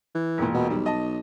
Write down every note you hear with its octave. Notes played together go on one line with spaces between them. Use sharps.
E3
E1 A#2
B2
B1 G3
D#5 A5